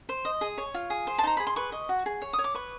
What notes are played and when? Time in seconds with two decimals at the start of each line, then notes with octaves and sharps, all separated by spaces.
0.09 C5
0.25 D#5
0.41 G#4
0.58 C#5
0.74 F4
0.90 G#4
1.07 C5
1.18 A5
1.23 D#4 A#5
1.37 G#4 B5
1.47 C6
1.56 B4 C#6
1.72 D#5
1.89 F#4
2.06 G#4
2.22 C#5
2.33 D#6
2.39 C#5
2.44 D6
2.54 B4 C#6